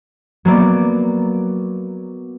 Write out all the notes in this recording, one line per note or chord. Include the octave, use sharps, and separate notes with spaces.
F#3 A#3 B3 D5